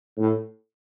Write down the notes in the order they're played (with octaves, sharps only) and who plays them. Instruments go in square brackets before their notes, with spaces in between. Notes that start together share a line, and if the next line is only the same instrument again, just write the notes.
[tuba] A2